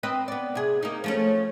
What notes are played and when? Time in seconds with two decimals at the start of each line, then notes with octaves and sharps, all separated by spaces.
0.03 C4 B4 D#5
0.28 B3 D5
0.55 C3 G#4
0.83 A#3 D#4
1.04 F3 A3 C#4